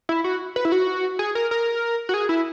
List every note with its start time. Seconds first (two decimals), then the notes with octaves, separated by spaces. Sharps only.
0.09 E4
0.24 F#4
0.56 B4
0.65 E4
0.72 F#4
1.19 G#4
1.35 A#4
1.51 A#4
2.09 F#4
2.14 G#4
2.29 E4